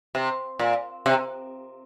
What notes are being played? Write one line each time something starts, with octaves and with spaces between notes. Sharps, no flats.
C3
A#2
C3